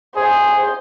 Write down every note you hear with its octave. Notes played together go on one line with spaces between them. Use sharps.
G#4 C5